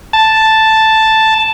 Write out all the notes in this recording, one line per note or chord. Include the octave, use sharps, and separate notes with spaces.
A5